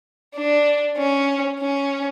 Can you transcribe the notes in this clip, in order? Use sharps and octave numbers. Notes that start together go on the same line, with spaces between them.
D4
C#4
C#4